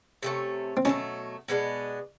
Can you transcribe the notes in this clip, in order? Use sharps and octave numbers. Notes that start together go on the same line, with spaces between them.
C3 E3 A3 C#4
C4
B2 F#3 A3 C#4
B2 G#3 B3 D4